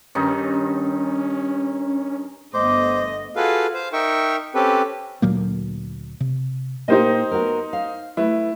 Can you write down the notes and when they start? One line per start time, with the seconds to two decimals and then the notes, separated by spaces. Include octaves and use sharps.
0.15 G2 D#3 C#4 D#4
2.54 G1 A3 B3 C5 D#5 D6
3.36 F4 F#4 G#4 A4 B4 F5
3.74 C5 F5
3.93 D#4 A#4 E5 G5 C#6
4.55 C4 C#4 G4 A4 B4
5.22 D2 A#2 F#3 A#3
6.20 C3
6.88 A#2 A#3 D#4 G4 C5 D#5
7.31 B3 F#4 A#4
7.73 F5
8.17 A3 E4 B4